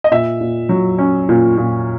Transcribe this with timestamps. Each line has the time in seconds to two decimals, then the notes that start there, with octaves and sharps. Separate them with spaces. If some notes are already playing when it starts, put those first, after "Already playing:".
0.04 D#5
0.11 A#2 E5
0.41 A#2
0.69 F#3
0.99 C#4
1.29 A#2
1.57 A#2